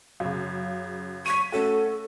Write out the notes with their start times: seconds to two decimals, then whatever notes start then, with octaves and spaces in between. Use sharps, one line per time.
0.20 F#2 C#3
1.26 C#6 B6 D#7
1.52 A3 C#4 F#4 A4